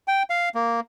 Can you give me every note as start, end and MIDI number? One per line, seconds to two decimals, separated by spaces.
0.08 0.23 79
0.30 0.49 77
0.55 0.80 58